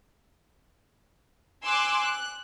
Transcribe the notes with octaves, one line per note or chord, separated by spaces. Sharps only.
G#5 C6 D6 E6 F#6
F#6